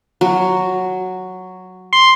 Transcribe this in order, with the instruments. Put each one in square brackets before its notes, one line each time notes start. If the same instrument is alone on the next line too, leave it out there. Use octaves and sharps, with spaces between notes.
[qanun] F#3
[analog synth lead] C6